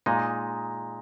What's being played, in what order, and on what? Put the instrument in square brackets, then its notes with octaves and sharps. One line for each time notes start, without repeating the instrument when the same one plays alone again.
[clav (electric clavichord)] A#2 G#3 D#4 [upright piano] A#5